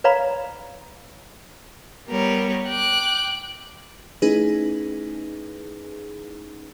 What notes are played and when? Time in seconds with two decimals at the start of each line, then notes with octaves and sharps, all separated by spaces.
0.04 B4 C#5 D5 F5 A#5 B5
2.08 G3 B3 A#4 C#5
2.68 G5 D6 F#6
4.22 A3 C#4 D#4 E4 G#4 B4